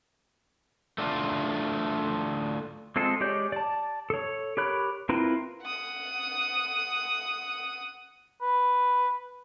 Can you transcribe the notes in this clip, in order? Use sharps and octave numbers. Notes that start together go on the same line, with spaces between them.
A3 D4 F4
G#3 C4 F4 A4
G#3 G4 C#5 D5 G6
D5 A5
A4 C#5
G4 A#4 C#5 B5 F#6
C4 E4 F4 A#4 B4
F#5 D#6
B4